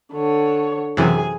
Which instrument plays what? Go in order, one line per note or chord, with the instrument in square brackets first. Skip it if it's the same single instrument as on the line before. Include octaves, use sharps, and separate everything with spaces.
[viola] D3 C#5
[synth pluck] F#2 C3 E3 [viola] G#4 G#5